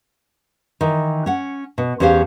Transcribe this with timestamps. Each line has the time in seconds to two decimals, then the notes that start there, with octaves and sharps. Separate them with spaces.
0.81 D#3 E3
1.26 C#4 F#5
1.78 B2
2.00 E2 C#4 G4 C5 F5